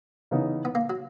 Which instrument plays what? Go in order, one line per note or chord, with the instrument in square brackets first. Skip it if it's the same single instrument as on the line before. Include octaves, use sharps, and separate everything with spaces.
[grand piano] C#3 E3 B3 D#4
[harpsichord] B3
A#3
F#3